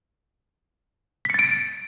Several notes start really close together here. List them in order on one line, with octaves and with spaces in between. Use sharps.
B6 C#7 A6 D7